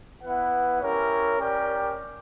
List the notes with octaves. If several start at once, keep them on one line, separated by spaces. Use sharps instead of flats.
B3 E4 B4 F#5
C#4 E4 G4 A#4 C#5
C#4 G4 A#4 D5 G5